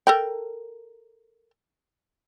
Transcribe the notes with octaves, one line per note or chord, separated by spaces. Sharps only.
A4 A#4 G5